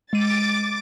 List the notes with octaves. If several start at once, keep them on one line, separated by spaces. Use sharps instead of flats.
G#3 D6 A6 D#7